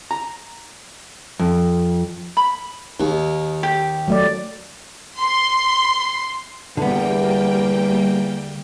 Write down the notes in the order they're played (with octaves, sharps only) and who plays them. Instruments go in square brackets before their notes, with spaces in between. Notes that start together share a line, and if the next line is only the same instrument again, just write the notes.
[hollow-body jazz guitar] A#5
F2
[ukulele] B5
[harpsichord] D#2 [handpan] D#4
[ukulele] G4
[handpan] F#3 A3 D5
[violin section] C6
[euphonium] E2 [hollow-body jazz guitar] D3 B3 [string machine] G3 A#3 G5